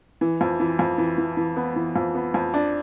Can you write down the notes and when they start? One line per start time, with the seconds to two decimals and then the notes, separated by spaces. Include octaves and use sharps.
0.21 E3
0.41 F2
0.60 E3
0.79 F2
0.98 E3
1.18 E3
1.37 E3
1.56 B3
1.76 E3
1.96 F2
2.15 B3
2.34 F2
2.54 D4